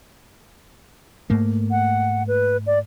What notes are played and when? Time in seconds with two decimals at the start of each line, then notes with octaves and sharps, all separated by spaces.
1.30 G#2 A3 A#3
1.71 F#5
2.28 B4
2.67 D5